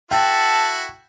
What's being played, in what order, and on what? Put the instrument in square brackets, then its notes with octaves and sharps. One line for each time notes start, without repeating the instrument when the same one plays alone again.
[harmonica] E4 F#4 [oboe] A4 [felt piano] G5 [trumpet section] A5